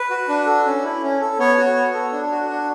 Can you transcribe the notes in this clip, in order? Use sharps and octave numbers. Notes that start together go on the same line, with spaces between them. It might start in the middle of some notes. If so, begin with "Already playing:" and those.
Already playing: B4
F#4
D4
A4
C#4
E4
C#4
A4
B3 C#5
F#4
B3
A4
D4
F#4
D4